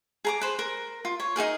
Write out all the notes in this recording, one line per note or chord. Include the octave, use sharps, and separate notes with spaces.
G#4 A#5 D6
B4 C5
A#4
F4
C#5
D#4 F#4 G#4 A#4